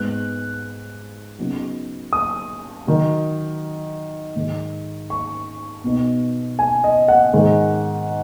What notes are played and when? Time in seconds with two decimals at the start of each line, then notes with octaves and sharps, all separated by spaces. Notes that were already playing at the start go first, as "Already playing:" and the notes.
Already playing: G#2 G#3 B3 F#6
1.38 C#3 F#3 B3 D#4
2.13 D#6
2.87 D#3 F#3 D#4
4.36 G#2 D#3 G#3 D#4
5.10 C#6
5.84 B2 B3 D#4
6.59 G#5
6.84 D#5
7.08 F#5
7.33 G#2 D#3 G#3